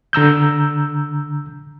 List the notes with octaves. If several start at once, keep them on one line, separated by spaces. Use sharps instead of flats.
D3 A#5 E6 G6